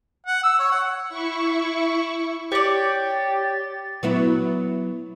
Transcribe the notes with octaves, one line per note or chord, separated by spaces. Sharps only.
F#5
E6
C#5
F#5
E4 C#6
G4 C#5 D5 A6
F#3 B3 E4